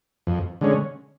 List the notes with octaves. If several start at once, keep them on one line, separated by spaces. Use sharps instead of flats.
F2
D3 G#3 C#4